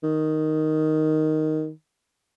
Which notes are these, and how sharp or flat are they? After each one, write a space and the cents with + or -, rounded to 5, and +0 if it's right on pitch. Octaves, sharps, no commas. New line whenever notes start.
D#3 +0